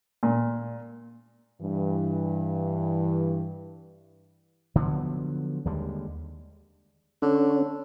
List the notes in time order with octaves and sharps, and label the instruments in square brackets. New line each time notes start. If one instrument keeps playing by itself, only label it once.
[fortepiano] A#2
[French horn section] G2 E3
[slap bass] D3 F3 F#3 B3
D#2 D3 G3 G#3
[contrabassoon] D3 [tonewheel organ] C#4